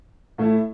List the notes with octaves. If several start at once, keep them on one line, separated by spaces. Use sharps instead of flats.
A2 A3 E4